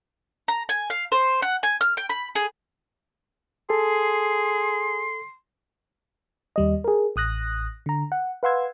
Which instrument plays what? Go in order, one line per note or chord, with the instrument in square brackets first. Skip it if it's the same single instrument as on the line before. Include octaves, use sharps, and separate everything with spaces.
[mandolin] A#5
G#5
F5
C5
F#5
G#5
F6
G5
B5
G#4
[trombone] G#4 [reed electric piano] A4 [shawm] C6
[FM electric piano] D#2 G3 D#5
G#4 A#4
A1 D#6 F#6 A#6
D3 A#5
F#5
B4 F5 F#5 C6 E6 G#6